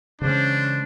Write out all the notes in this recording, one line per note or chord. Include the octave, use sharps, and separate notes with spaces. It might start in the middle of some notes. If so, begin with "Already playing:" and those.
C#3 E3 G#3 C#4 D4 C5